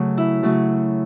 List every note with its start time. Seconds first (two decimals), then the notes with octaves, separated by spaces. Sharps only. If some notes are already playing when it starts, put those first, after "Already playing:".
Already playing: C#3 F#3 A3
0.18 E4
0.43 C#3 F#3 A3